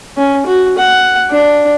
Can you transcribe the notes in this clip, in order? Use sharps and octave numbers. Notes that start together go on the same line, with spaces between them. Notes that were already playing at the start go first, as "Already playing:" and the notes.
C#4
F#4
F#5
D4